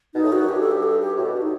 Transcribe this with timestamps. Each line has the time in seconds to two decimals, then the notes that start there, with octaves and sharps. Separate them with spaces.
0.14 B2 D#4
0.23 A2
0.32 G2 F#4
0.40 F#2
0.49 G2 G4
0.60 A4
0.71 G4
0.83 A4
0.99 G4
1.16 A2 F#4
1.24 B2
1.33 G2
1.42 D#4